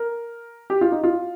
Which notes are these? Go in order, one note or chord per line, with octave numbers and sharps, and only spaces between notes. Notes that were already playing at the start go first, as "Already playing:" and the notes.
Already playing: A#4
G4
F4
D#4
F4